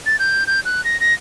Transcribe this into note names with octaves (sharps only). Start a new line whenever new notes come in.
A6
G6
G6
F#6
A#6
A#6